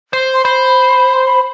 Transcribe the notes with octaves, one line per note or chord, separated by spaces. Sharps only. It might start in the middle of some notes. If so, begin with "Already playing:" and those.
C5
C6
C5 B5
C6
B5